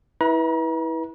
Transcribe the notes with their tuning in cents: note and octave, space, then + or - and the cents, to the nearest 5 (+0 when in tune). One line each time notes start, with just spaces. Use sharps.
E4 -25 B4 -15 A#5 +40